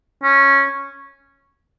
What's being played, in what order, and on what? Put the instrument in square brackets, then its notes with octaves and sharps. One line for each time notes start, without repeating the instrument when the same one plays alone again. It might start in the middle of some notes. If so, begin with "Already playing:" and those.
[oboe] C#4